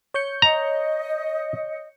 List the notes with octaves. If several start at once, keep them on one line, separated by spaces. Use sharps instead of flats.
C#5 G6 C#7
D#5 A#5